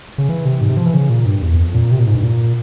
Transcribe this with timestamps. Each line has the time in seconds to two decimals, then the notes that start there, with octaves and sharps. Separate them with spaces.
0.18 C#3
0.29 E3
0.45 C3
0.61 G#2
0.69 C3
0.77 F3
0.86 E3
0.94 C#3
1.10 A#2
1.26 G2
1.42 E2
1.59 F2
1.74 A#2
1.91 C3
1.99 A#2
2.07 G#2
2.15 G2
2.24 A#2